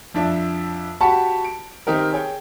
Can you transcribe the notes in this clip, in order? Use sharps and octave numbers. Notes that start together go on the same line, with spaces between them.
F2 D4 E5
F#4 G4 F#5 A5 B5 C#6
D7
D#3 C4 D#4 G4 A#4
G#4 C#5 G5